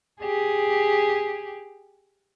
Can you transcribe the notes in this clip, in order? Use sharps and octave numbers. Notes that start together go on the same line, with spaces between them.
G4 G#4